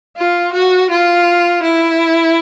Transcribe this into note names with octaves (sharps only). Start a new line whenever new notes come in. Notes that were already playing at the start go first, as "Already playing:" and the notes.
F4
F#4
F4
E4